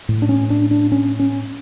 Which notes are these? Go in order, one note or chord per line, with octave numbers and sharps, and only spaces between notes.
A2
D4
C#4
D4
D4
C#4
C#4